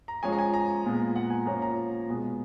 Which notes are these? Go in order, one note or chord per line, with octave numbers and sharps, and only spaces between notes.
A#5
F3 G#3 C#4 G#5
A#5
G#5
A#5
A#2 G#3 B3
F#5
G#5
F3 A#3 C#4 A#5
A#5
B2 G#3 B3